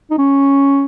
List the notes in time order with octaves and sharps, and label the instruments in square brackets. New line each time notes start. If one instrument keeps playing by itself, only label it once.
[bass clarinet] D#4
C#4